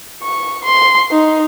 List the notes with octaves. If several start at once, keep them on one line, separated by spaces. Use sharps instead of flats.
C#6
C6
D#4